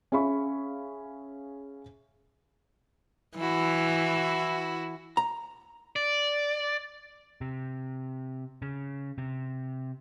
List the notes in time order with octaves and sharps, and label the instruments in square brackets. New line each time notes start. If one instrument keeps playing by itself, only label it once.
[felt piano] C#4 G#4 E5 F5 B5 C#6
[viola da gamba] E3 [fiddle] E4 F#4
[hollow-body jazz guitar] A#5
[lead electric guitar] D5
[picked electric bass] C3
C#3
C3